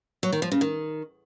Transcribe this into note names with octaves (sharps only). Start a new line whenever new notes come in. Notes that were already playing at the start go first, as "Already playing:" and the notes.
F#3
D#3
F3
C#3
D#3